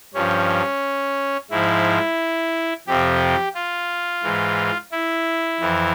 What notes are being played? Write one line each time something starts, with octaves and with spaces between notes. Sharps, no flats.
G2 F3 C#4
G#2 F3 E4
F2 C3 F3 G4
F4
G#2 E3
E4
F2 E3